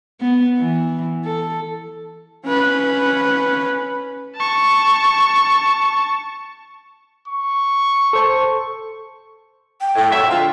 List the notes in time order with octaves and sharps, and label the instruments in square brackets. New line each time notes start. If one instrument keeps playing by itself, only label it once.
[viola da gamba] B3
E3
A4
[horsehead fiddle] C#4 B4
[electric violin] A5 C#6
[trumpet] C#6
[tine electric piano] A4 C5 A5
[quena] G5
[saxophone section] A2
F2 F#3 E5
D3 G#3 F4